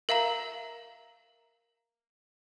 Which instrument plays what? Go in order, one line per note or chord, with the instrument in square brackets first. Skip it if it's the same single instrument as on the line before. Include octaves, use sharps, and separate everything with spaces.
[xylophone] A#4 E5 F5 A#5